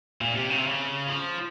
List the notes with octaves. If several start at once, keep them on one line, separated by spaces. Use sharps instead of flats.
A#2
C3
C#3
C3
C#3
F3